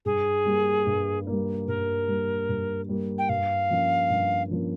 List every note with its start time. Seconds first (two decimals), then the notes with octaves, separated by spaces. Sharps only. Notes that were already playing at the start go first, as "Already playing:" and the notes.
0.05 G2 G#4
0.46 G3 A#3
0.86 G2
1.27 G3 A#3
1.67 G2 A#4
2.08 G3 A#3
2.49 G2
2.89 G3 A#3
3.18 G5
3.29 G2 F5
3.71 F3 A#3 C#4
4.10 G2
4.51 F3 A#3 C#4